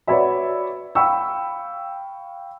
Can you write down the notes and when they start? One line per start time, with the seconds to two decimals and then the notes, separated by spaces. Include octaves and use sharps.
0.07 F#4 B4 C#5 D5 E5 B5
0.95 F5 G5 B5 C#6 E6